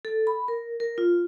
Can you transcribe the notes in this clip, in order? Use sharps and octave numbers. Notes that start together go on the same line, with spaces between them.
A4
B5
A#4
A#4
F4